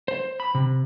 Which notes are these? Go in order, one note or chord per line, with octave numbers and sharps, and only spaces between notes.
C5
B5
C3